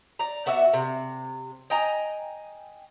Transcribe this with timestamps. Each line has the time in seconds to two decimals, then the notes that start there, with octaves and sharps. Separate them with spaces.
0.19 D5 A#5
0.46 B3 F#4 D5 E5
0.73 C3
1.70 D#5 G5 G#5 A#5